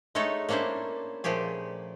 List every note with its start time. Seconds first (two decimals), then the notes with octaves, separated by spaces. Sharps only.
0.15 G#3 A3 D#4 A4 C#5
0.49 A#3 C#4 D4 E4 C5
1.24 A#2 F3 A3 G4 G#4